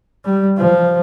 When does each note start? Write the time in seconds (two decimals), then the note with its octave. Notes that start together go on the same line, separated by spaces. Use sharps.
0.25 G3
0.58 F3